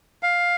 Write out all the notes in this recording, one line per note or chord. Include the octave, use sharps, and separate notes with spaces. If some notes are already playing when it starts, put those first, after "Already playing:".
F5